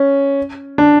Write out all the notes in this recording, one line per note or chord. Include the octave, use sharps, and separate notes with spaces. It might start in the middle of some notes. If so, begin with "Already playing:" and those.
Already playing: C#4
D4